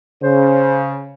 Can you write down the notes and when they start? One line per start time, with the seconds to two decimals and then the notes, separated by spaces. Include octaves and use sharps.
0.23 C#3 C5